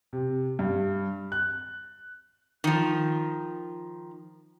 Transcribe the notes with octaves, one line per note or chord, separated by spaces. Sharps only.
C3
G2
F#6
D#3 F3